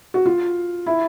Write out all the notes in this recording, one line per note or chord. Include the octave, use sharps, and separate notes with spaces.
F#4
F4
E4